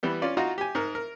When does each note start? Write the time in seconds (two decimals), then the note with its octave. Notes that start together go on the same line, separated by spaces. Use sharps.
0.03 E3 G3 B3
0.22 C#4 F4 D5
0.37 D#4 F4 F#4 F5 A#5
0.58 G4 G#5
0.75 G#2 A#4
0.95 A#4